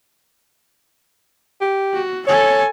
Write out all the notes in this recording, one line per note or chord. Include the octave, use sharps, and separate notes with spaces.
G4
F#4
A4 C#5 G#5